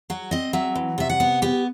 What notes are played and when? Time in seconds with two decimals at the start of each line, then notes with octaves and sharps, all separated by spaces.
0.10 F#3 F#4
0.31 C4 D#5
0.53 F#3 E5
0.75 E3
0.98 C3 E5
1.10 F#5
1.20 B3
1.42 B3 G4